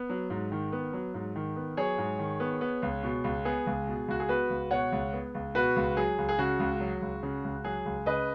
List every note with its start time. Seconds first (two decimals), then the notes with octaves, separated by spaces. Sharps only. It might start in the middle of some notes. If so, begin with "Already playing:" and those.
Already playing: B3
0.09 F#3
0.30 G#2
0.52 D#3
0.72 B3
0.93 F#3
1.14 G#2
1.36 D#3
1.56 B3
1.77 F#3 G#4 C#5
1.98 G#2
2.19 D#3
2.40 B3
2.61 B3
2.82 C#2
3.03 B2
3.24 C#2
3.45 B3 G#4
3.67 C#2
3.87 B2
4.08 C#2 F#4
4.20 G#4
4.28 B3 F#4 B4
4.50 C#2
4.71 B2 C#5 F#5
4.92 C#2
5.13 B3
5.34 C#2
5.55 B2 F#4 B4
5.76 C#2
5.97 F#3 G#4
6.18 C#2
6.29 G#4
6.39 C#3 F#4
6.60 C#2
6.80 F#3
7.02 C#2
7.23 C#3
7.44 C#2
7.64 F#3 G#4
7.86 C#2
8.06 C#3 B4 D#5